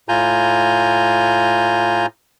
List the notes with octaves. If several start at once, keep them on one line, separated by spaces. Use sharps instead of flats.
A2 F4 G#5 A#5 G6